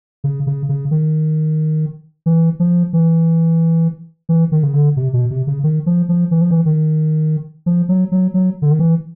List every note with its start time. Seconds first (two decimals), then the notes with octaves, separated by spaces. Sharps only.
0.24 C#3
0.47 C#3
0.69 C#3
0.91 D#3
2.26 E3
2.60 F3
2.93 E3
4.29 E3
4.52 D#3
4.63 C#3
4.74 D3
4.97 C3
5.13 B2
5.30 C3
5.47 C#3
5.64 D#3
5.86 F3
6.09 F3
6.31 E3
6.41 F3
6.51 E3
6.66 D#3
7.66 F3
7.89 F#3
8.12 F#3
8.34 F#3
8.62 D3
8.71 D#3
8.79 E3